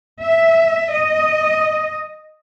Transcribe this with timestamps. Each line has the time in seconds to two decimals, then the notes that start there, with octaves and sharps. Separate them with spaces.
0.22 E5
0.91 D#5